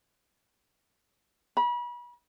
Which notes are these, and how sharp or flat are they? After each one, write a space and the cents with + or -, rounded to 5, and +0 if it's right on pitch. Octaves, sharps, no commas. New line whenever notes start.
B5 -35